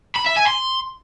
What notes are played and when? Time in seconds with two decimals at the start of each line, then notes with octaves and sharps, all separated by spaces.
0.16 B5
0.27 E5
0.37 G#5
0.47 C6